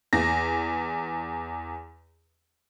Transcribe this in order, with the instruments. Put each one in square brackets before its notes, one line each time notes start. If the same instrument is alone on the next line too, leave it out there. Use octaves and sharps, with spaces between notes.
[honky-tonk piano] E2 A#6